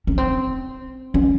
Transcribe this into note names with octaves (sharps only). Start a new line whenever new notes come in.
C#4
C4
C#4